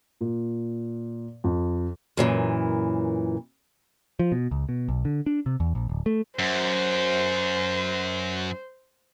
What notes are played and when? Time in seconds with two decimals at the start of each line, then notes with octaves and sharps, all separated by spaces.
0.21 A#2
1.44 F2
2.17 F#2 A#2 E3
4.19 F3
4.32 B2
4.51 C#2
4.69 B2
4.89 B1
5.05 D3
5.26 D4
5.46 C3
5.60 E2
5.75 A#1
5.89 D1
6.06 A3
6.39 F#2 C5